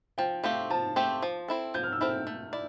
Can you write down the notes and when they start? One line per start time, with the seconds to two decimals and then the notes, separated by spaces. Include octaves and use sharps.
0.18 F3 G5
0.44 A3 C4 G4 F5
0.70 F3 A5
0.96 A3 C4 G4
1.23 F3
1.48 C4 E4 A4
1.74 F3 G6
1.83 F6
1.92 E6
2.01 C4 E4 A4 F6
2.27 A3
2.53 E4 D5